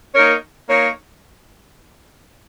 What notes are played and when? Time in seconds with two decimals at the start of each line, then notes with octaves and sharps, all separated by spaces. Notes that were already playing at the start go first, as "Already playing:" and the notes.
0.14 A#3 D#4 A#4 C#5
0.67 A#3 D#4 A#4 C#5